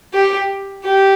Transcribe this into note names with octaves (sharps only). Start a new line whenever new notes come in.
G4
G4